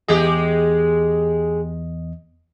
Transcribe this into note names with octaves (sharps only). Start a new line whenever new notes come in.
E2 G#3 G4 G#4 D#5